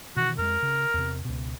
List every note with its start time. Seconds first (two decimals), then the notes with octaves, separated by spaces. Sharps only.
0.17 B2 D#3 E3 F#4
0.38 F2 G#3 A#4
0.62 C#3
0.94 E2 C3
1.25 C#2 B2